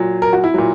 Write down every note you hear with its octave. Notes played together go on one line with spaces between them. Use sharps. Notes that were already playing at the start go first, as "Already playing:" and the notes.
Already playing: A#2 F#3
A#4
F#4
E4
A#2 F#3